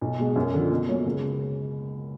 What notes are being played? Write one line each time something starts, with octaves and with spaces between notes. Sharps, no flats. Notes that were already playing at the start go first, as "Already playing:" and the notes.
B1
B2 G#3
F#2
D3 F3
B2
F#3 A#3 C#4
C#2